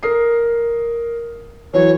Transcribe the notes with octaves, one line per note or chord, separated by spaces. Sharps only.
A#4 D#6 C7
E3 F#3 C#5